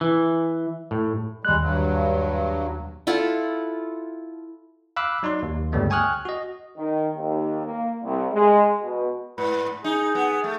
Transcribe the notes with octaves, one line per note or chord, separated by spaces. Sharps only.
E3
A2
D#2 G3 G#3 F#6
G2 F#3
E4 F4 A4 F#5
F5 B5 D6 E6 F#6
F#3 D#4 D5 C6
D#2
C#2 G2 D3 G3 A3 B3
G5 G#5 C#6 D#6 F6 F#6
F#4 D#5
D#3
D#2
A#3
C2
G#3
B2
G#2 B4
D#4 G#4
B3
A3